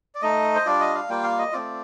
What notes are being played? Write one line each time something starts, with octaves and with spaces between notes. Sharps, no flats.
D5
A3 D#4 D#5
C5
G3 D4 F4 D5
D#5
F5
G3 A#3 F4 G5
F5
D#5
A3 C4 F4 D5